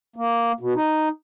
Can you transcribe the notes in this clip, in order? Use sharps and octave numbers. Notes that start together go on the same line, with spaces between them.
A#3
B2
D#4